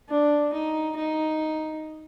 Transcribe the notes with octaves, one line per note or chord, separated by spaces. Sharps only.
D4
D#4
D#4